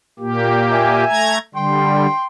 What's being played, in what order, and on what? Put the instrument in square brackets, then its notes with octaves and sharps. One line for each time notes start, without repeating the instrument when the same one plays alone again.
[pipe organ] A#2 A#3 G4
[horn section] E5 G#5
[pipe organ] A3 A#5 G#6
[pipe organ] D3 G3 [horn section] G5 C6